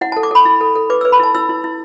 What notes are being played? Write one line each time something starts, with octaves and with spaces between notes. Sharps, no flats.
E4 F#5
A4 A5
D6
A4 B5
E4
A4
A4
B4 D6
B4 E6
B5
E4 A5
E4 E6
E4
E4